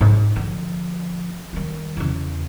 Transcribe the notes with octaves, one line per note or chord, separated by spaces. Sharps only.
G#2 D#4
D3 F3
D#3 G3
E2 C#3